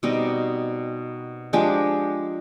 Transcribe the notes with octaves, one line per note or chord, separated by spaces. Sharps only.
B2 G3 C4 D#4
F3 G#3 D4 G4